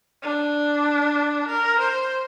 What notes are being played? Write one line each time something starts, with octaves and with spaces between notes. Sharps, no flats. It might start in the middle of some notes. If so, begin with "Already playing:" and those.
D4
A#4
C5